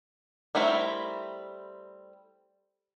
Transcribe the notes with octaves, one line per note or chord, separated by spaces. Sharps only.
G3 A3 C4 E4 A#4